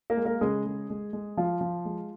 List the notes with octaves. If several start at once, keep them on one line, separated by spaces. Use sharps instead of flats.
A#3 A#4
G#3
A#3 A#4
C#3 G#3 G#4
G#3
G#3
G#3
F3 F4
F3
G#3